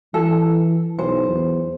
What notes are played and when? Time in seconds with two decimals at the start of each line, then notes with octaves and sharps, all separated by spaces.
0.14 E3 A4
0.99 B1 C5
1.28 E2